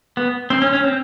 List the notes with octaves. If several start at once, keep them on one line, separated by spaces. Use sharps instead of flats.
B3
C4
C#4
C#4
C4